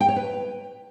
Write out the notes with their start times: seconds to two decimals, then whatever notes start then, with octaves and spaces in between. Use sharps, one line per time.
0.01 G5
0.08 C#5
0.16 B4